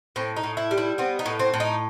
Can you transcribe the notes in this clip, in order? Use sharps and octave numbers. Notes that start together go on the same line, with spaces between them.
A2 C4
D#4
A2
E4
G3
E4
B3 C4
D#4
A2
C4
A2
D#4